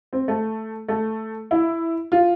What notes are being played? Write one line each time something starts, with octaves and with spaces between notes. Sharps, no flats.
C4
A3
A3
E4
F4